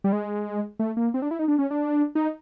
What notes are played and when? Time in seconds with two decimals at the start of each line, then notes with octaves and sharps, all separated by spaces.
0.04 G3
0.13 G#3
0.79 A3
0.97 A#3
1.14 C4
1.22 D4
1.31 E4
1.39 D#4
1.48 D4
1.59 C#4
1.71 D4
2.15 D#4